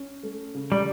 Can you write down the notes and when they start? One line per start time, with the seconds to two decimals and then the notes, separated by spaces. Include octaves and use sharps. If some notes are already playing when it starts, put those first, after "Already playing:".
Already playing: C#4
0.23 A3
0.54 C#3
0.72 G3